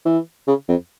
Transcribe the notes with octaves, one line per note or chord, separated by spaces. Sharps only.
E3
C#3
F2